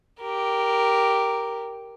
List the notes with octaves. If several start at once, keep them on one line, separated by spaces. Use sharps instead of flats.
G4 A#4